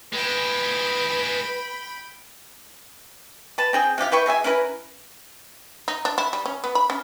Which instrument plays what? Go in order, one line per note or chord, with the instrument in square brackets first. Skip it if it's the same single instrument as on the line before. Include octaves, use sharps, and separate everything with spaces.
[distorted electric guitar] G#3 E4 [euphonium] B4 [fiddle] G5 B5
[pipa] B4 A5
C4 G#4 G5
C3 F3 G4 F5
E4 B4 G5 C#6
B2 G#4 E5 G#5
C#4 E4 A#4 B4
[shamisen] D#4
D4
E4
G3
C#4
B3
B5
C#4